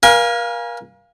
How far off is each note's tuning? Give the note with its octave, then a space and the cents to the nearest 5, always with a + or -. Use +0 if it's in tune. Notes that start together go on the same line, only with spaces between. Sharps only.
A#4 +40 F5 +0 G#5 -15